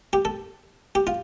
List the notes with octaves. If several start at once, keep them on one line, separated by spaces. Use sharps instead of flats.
G4
A4
G4
F4